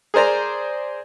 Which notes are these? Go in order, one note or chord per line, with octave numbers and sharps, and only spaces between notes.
G#4 A#4 C5 D5 A#5